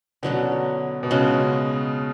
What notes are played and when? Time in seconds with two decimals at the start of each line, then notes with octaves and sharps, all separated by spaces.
0.23 B2 D3 F#3 C#4 F#4
1.03 B2
1.11 C#3 G#3 C#4 F#4